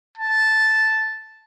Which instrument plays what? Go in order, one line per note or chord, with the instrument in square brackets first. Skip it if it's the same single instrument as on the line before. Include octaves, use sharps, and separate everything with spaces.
[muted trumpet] A5